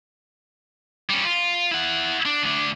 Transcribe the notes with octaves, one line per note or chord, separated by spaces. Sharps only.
G3 C#4
F4
E4 F#5
D4
D2 D4